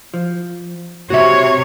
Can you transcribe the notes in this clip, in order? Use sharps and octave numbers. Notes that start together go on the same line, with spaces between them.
F3
C3 F#4 C#5 E5